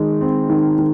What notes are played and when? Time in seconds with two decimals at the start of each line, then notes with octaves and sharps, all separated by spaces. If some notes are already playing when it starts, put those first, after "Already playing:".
Already playing: D#3 G#3
0.21 C4
0.50 D#3
0.79 D#3